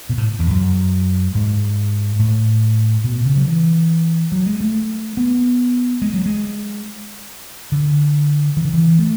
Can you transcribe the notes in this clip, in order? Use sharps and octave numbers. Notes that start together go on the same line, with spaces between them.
B2
A2
E2
F#2
G#2
A2
B2
C#3
F#3
E3
F#3
G#3
A3
B3
G#3
F#3
G#3
D3
E3
D3
E3
A3